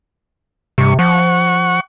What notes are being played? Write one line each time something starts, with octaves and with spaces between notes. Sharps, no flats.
G2 C3 C#6
F3 F#5 C#6